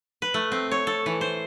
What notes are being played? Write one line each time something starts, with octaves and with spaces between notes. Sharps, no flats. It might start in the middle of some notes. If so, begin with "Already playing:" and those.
B4
A3
C4
C#5
A4
E3
C5